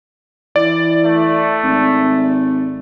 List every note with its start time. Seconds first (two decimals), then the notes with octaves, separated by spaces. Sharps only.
0.56 E3 D5
1.06 A3
1.63 G#1